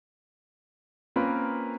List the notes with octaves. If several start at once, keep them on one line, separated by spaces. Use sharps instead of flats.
A#3 C4 C#4 F4 A#4 B4